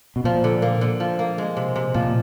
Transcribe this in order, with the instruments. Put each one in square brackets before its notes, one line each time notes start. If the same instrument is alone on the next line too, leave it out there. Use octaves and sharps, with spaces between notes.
[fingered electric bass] B2
[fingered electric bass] A#2 [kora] F3
[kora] D3
A#3
D3
F3
A#3
G#3
C3
C3
[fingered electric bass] A#2 [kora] F3